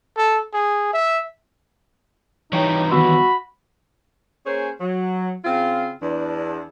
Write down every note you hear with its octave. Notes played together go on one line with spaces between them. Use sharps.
A4
G#4
E5
E3 G3 D#4 C#5 G5
D#3 B3 F#4 B5 E6
A#3 C#4 G#4 C5 C#5
F#3
C#3 C4 F4
E2 D4